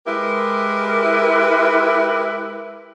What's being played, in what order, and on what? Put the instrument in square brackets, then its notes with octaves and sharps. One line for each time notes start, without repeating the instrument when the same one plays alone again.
[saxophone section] G#3 E4 G4 A#4 B4